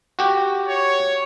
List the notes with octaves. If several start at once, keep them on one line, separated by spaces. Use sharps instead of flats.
F#4 G4
C#5